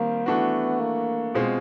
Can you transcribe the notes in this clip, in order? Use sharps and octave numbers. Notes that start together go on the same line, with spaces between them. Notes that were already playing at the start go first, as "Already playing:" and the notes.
Already playing: D#3 G3 A#3 C4
E3 A3 B3 D4 F#4
A#3
B2 G#3 C4 F4